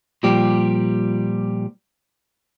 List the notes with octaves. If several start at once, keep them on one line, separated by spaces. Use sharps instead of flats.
A#2 F3 G3 G4